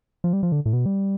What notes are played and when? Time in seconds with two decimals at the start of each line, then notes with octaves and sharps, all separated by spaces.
0.24 F3
0.33 G3
0.43 F3
0.52 D3
0.66 A2
0.73 B2
0.86 G3